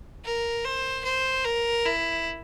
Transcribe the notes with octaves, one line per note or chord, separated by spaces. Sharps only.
A#4
C5
C5
A#4
E4